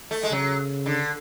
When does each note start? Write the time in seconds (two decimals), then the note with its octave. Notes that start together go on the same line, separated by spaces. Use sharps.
0.11 A3
0.23 G#3
0.31 C#3 F#3
0.86 D3